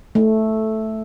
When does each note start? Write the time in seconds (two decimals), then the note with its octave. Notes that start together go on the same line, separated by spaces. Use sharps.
0.15 A3